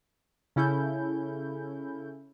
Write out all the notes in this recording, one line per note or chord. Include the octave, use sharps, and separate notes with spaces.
C#3 C#4 E4 A4 G6